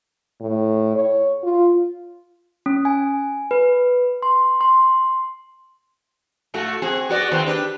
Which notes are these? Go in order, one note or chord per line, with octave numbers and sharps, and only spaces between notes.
A2
C#5
F4
C#4
G#5
B4
C6
C6
A2 A3 F#4
C4 F#4 G#4
B3 F#4 D5
D#2 B3 C4
D4 G4 B4